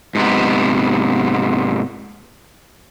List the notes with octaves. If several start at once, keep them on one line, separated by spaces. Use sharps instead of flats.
G#2 C3 B3